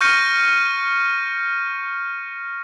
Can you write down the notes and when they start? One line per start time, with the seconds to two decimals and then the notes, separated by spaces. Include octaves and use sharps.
0.01 C#6 F6 G6 A#6 C#7 D#7